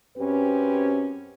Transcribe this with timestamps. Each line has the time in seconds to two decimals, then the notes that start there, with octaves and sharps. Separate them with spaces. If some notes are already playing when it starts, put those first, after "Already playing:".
0.17 F#2 C4 C#4 G4 B4